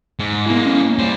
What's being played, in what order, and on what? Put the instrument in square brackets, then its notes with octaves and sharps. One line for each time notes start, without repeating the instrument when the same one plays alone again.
[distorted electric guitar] G#2
[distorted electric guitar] G#3 A#3 [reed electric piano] B3 E4
[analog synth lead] C#4
[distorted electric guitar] G3 C5